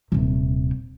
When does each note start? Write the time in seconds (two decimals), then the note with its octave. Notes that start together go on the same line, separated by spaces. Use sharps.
0.12 D#1 C3